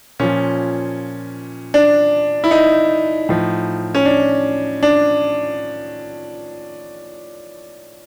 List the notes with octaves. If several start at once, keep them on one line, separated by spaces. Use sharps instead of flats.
A#2 F3 C#4
D4
E4
D#4
A2 F3
C#4
D4
D4